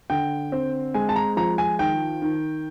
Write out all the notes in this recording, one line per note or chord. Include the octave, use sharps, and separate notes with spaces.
D3 G5
C4
G#3 G#5
A5
A#5
F3 A#5
G#5
D#3 G5
D#3